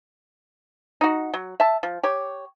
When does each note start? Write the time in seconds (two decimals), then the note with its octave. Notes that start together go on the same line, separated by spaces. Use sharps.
1.01 D#4 F#4
1.34 F#3
1.60 E5 A5
1.83 F3
2.03 G4 C#5